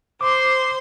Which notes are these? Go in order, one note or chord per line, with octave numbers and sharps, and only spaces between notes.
C5 C6 D6